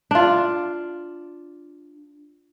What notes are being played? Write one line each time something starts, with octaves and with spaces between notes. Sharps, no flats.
D4 F4